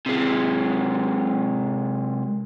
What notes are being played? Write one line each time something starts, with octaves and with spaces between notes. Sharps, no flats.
C3 G#3